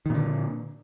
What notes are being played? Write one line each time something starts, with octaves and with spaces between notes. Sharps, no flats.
A#2 D3 D#3